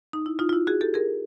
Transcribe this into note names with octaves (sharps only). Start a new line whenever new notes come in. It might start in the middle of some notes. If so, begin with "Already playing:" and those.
D#4
E4
D#4 F4
F4
E4 F#4
F#4 G#4
G4 A4
G#4 A#4